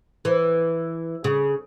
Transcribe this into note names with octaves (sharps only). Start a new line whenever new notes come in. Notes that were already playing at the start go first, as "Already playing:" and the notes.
E3
C#3